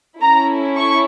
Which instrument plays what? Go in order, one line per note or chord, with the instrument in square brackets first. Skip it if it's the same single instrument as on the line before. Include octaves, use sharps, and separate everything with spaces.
[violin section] C#4 E4 A4 A#5
C#6